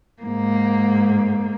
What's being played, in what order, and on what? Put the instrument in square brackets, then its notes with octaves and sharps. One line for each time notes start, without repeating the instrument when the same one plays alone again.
[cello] G#2 A#3